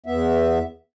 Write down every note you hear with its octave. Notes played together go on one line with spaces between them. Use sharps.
E2 B3 E5